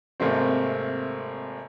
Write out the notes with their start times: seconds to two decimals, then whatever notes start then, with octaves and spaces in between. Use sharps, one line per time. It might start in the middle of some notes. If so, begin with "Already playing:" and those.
0.20 G#1 C3 A3 A#3 C4